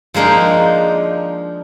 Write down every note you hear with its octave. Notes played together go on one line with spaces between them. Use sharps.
F3 G#3 A#3 D4 D#4